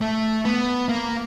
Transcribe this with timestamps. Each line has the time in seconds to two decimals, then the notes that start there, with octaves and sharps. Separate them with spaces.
0.01 A3
0.45 B3
0.89 A#3